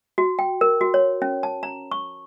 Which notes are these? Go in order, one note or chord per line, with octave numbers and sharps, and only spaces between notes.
F#4
G5
A#4
F#4
C#5
C#4
A5
A#5
C#6